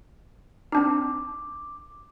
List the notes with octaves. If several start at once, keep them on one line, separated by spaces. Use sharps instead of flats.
C4 D4 D#4 D6